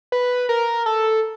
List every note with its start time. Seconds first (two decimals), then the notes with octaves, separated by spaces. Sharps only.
0.12 B4
0.49 A#4
0.86 A4